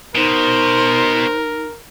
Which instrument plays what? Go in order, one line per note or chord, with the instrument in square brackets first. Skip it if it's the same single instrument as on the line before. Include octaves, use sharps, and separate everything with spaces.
[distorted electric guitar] B2 [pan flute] D#4 [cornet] A#4 [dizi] C5